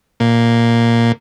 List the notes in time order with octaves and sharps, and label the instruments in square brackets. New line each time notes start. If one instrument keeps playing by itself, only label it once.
[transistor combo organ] A#2